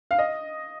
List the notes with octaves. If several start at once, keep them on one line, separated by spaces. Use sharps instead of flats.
F5
D#5